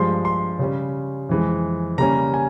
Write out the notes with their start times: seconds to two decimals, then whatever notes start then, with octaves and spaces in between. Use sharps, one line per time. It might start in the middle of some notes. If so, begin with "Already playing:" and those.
Already playing: G2 F3 G#3 C6
0.25 C6
0.59 C#3 G3 C#4
1.29 F2 E3 G#3
1.98 C#3 G3 A#3 C#4 A#5
2.34 G#5